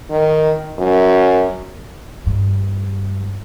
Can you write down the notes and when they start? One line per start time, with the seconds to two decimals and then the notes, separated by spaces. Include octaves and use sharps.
0.10 D#3
0.78 F#2
2.26 G2